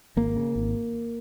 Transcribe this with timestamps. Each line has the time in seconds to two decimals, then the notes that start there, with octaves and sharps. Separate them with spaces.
0.16 G#1 A#3
0.36 C#3
0.56 G#1